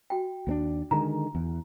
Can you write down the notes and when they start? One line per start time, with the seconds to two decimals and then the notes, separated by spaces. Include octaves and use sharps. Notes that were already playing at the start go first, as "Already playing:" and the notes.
0.10 F#4 G5
0.47 D#2 B3 D4
0.91 D3 D#3 G#3 A#5
1.35 E2